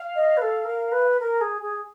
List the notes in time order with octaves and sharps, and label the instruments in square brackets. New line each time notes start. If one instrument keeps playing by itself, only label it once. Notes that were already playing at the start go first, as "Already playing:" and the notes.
Already playing: [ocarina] F5
[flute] D#5
B4
A4
A#4
B4
A#4
G#4
G#4